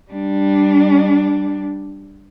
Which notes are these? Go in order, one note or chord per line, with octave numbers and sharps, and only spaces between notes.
G3 D4